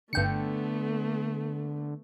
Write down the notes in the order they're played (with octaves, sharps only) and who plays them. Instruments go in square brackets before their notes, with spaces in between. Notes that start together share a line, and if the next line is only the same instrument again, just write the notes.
[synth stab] G1 G5 C#7 [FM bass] D3 [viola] A3 B3